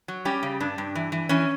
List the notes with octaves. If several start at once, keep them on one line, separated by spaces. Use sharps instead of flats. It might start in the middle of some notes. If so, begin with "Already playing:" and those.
F#3
G3 C#4 G4
C#3
G2 D4
G2
E3
E3
E3 C#4